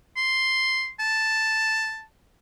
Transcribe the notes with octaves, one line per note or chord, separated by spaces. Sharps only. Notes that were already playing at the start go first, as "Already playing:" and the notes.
C6
A5